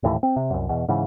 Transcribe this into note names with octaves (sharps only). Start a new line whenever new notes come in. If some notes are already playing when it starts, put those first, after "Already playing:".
D#1 D#2 A2 E3
C4
C3
C2 F#2
E2 B2
G#2 C#3 E3